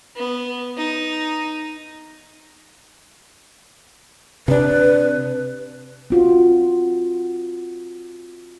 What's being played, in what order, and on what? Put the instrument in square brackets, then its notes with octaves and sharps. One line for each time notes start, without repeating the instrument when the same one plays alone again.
[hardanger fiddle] B3
D#4
[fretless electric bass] C3 D4 [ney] B4
[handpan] C4 F4 F#4